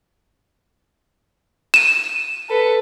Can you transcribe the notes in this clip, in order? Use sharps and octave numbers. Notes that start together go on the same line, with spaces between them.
D#7 E7
A4 B4